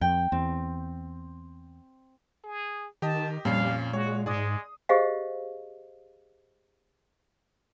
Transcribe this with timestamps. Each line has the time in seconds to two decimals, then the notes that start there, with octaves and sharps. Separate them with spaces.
0.01 F2 G5
0.32 E2 C4
2.44 G#4
3.02 D#3 G4 D#5 A5
3.45 F2 A#2 G3 C#4 F5 C7
3.93 G#3 F#4 C#5
4.26 G#2 G#3 G#4 D5 D#6
4.89 G4 G#4 C5 D#5 F5 F#5